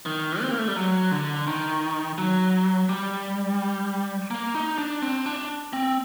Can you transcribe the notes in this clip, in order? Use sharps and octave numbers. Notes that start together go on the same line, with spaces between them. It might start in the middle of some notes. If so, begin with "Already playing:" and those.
D#3
C4
A#3
A3
G3
F#3
D3
D#3
F#3
G3
A#3
D#4
D4
C4
D4
C4